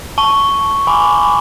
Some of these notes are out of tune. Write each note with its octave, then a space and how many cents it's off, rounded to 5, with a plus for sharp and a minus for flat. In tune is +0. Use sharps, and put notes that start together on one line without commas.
A5 +0 C#6 +0
G#5 +0 B5 +15 D6 -10